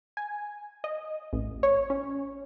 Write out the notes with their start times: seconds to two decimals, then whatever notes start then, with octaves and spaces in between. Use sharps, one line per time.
0.17 G#5
0.84 D#5
1.33 A1
1.63 C#5
1.90 C#4